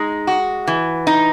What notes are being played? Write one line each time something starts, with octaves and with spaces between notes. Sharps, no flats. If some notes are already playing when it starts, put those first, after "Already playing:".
Already playing: G#3 D#4
F#4
E3
D#4